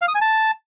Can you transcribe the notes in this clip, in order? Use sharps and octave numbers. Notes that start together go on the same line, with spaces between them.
F5
D#6
G#5
A5